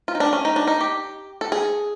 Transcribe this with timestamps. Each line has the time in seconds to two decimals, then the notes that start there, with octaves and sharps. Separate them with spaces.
0.08 F4
0.15 D#4
0.20 D4
0.33 C#4
0.45 D#4
0.56 D4
0.67 D#4
0.81 G4
1.41 A4
1.52 G#4